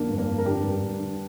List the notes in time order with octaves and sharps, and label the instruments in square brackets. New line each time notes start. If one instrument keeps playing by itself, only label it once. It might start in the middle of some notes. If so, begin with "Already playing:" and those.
Already playing: [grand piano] F2 D3 A#3 D4
G2
A#3 D4
G2
A#4
D3 D4 G4
G2
G2
D3